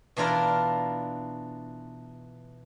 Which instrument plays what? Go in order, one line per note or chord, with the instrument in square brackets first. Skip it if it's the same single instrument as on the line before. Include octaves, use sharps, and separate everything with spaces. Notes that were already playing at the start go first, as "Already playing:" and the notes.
[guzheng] B2 E3 D4 F4 A#4